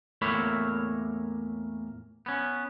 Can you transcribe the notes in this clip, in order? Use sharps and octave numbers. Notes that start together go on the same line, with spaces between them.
E2 A2 A#3 C#5 E5 B5
B3 C#4